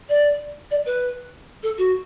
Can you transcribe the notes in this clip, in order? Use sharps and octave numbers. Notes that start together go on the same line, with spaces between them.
D5
D5
B4
A4
F#4